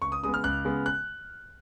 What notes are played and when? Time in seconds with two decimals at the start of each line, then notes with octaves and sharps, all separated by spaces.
0.02 C#2 C#6
0.12 D#6
0.23 C#3 G#3 B3 D#6
0.34 F6
0.44 C#2 F#6
0.65 C#3 G#3 B3
0.86 F#6